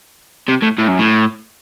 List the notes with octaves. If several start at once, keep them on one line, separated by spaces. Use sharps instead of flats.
C3
A2
A2
F#2
A2